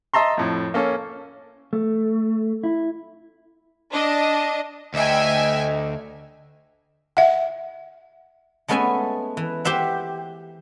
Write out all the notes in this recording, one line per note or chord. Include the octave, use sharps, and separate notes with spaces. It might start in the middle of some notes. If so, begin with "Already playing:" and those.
D#5 E5 A5 A#5 C6
F2 A2
A#3 C#4 A4
A3
E4
D4 D#5
D2 D#5 E5 G5 G#5
E5 F#5
G#3 A3 B3 C#4 E5 G#5
E3
G4 C5 E5 F#5